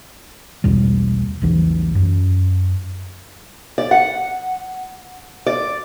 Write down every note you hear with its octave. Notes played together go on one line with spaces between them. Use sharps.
B1 E2 B2 G3
A#1 E2 E3
F#2
D5
F#5
D5